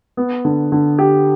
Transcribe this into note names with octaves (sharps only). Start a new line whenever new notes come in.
B3
D3
D3
G4